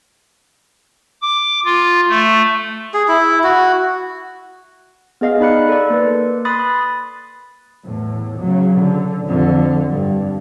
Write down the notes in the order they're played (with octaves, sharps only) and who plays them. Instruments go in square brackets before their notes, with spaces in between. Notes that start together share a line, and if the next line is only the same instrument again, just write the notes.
[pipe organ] D6
F4
A3
[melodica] G#4
E4
F#4
[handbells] B3 G#4 D#5 F5
D#4 D5 B5 F#6 C#7
A4 D5
A#3 B4
B5 C6 D#6 F#6 A6
[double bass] E2 A2
C#3 F#3
D3
F2 D3
G2